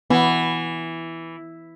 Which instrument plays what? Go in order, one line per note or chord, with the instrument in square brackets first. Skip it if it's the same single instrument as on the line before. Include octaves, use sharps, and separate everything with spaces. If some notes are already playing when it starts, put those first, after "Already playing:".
[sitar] E3 [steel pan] B3